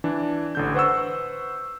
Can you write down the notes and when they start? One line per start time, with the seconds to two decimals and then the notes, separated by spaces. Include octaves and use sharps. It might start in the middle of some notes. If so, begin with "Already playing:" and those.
0.04 E3 D4
0.55 A1 D3 G6
0.74 B4 C5 F#5 C#6 E6